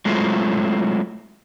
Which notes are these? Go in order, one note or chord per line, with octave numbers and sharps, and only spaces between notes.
F#3 G#3 A3 C4 E4 F4